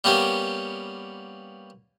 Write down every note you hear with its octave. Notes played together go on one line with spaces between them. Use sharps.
G3 A#3 B3 C#4 G4